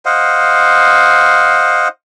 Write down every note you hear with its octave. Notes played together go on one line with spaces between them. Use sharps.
C5 D#5 F5 F#5